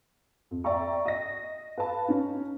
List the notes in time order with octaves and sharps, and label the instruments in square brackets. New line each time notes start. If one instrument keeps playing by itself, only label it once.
[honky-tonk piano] F2
D5 E5 G5 A#5 C#6
D#5 A#6
B4 F5 A5
C#4 D#4